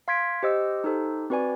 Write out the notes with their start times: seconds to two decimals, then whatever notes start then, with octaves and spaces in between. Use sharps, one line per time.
0.08 F5 C6 G#6 B6 D7
0.43 G4 C5 D#5 E6
0.84 D#4 G4 A4 C5
1.30 C4 F#4 B4 D5 G#5